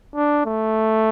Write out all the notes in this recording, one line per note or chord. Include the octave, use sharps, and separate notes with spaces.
D4
A3